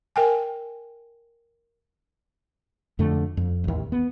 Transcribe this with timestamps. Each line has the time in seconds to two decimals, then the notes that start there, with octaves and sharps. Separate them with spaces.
0.16 A#4 G5 G#5
2.99 F2 D3 A3
3.37 F2
3.64 A1 D#2
3.92 B3